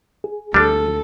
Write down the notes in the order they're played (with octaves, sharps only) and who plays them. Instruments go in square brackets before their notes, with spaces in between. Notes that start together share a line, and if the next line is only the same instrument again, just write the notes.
[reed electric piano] G#4
[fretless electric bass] D2 [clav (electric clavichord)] G3 D4 [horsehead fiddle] A4